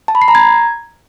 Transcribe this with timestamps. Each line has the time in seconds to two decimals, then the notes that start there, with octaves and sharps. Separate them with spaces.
0.08 A5
0.15 B5
0.22 C7
0.28 A#5
0.35 G#6